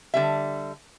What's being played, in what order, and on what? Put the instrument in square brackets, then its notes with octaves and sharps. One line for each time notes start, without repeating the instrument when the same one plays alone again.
[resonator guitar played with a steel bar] D3 G3 E5